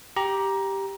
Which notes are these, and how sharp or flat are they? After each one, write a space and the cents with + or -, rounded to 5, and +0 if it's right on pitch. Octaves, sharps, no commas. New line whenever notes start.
G4 +0 A#5 +15